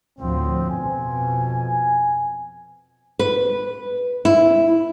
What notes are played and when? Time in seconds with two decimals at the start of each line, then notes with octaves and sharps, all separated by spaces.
0.19 D2 A2 F3 C4
0.70 F2 B2 G#5
3.19 B4
4.25 E4